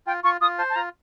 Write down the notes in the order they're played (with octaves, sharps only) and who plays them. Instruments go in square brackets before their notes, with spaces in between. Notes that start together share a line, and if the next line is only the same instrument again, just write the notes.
[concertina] F4 [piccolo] G5
[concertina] F4 [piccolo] C#6
[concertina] F4 [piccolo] D#6
[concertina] C5 [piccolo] A5
[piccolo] A5
[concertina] F4 [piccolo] A#5